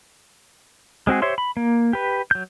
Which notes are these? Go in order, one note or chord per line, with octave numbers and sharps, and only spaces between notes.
G#3 C4 F#4 G#4
G4 C5 C#5 E5 C6
B5
A#3
G4 B4
F#3 G6